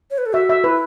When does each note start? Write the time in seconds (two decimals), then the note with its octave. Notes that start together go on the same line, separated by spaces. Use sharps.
0.11 C#5
0.18 B4
0.26 A4
0.34 F#4 E5
0.49 E5
0.64 E4 B4